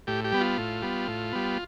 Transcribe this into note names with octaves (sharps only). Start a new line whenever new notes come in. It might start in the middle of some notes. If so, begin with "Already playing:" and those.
A2 G4
G4
G3 B3
F4
A2
G3 B3
A2
G3 B3